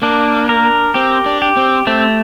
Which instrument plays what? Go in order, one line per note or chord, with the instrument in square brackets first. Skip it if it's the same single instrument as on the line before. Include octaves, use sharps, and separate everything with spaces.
[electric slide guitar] A#3 [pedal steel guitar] D4
[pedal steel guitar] A#4
[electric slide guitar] C4 [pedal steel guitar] G4
[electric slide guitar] D4
[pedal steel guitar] G4
[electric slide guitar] C4
[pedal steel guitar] A3 [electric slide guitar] C4